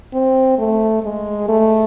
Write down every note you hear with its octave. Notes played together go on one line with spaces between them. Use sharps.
C4
A3
G#3
A3